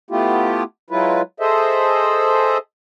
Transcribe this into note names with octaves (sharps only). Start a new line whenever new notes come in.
A3 B3 E4 F4 G4
F#3 G#3 E4 F4 B4
G#4 A4 C5 D#5 E5